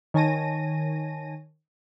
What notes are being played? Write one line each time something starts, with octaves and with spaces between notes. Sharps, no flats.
D#3 C#5 G#5 A5 A#6 D#7